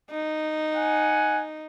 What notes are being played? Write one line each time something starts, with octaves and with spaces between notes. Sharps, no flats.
D#4
F#5 G#5